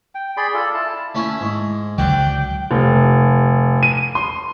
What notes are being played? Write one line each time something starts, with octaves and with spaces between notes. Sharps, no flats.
G5
G#4 D5 B5 C6
F4 A4 D5
E4 A5
A3 C#4 E4
G#2
C#2 D3 F#3 D5 F#5 G5 D6
F1
D#7
C6